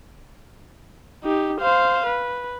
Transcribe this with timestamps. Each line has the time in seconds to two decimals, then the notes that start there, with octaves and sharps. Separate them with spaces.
1.24 D#4 G4
1.60 C5 F5
2.06 B4